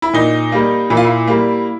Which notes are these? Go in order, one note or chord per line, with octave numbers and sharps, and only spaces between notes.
E4
A#2 D#4
G3 A#3
A#2 E4
F4
E4
G3 A#3